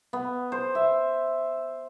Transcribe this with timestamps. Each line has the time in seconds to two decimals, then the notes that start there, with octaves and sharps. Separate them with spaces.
0.13 B3
0.52 C5
0.75 E5